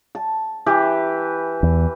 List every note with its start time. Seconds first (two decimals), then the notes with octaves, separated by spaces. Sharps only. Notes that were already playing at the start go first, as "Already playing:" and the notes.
0.15 A5
0.66 E3 G4 B4
1.63 E2